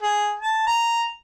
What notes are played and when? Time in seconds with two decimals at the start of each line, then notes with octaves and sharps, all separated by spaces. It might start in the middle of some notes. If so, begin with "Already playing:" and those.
0.02 G#4
0.39 A5
0.67 A#5